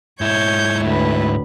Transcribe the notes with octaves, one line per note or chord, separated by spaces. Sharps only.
G#2 E4 C#5 G6 G#6
D2 A2 B4